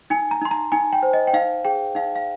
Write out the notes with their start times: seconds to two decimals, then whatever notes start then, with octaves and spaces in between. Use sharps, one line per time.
0.10 D#4 G#5
0.31 A#5
0.42 D#4 C6
0.51 A#5
0.72 D#4 G#5
0.93 G5
1.03 C5
1.13 D#5
1.27 G5
1.34 D#4 F5
1.65 G#4 G5
1.95 D#4 F5
2.16 F5